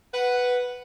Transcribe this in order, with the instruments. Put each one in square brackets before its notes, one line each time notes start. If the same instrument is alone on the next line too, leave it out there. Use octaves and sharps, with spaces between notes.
[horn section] B4 F#5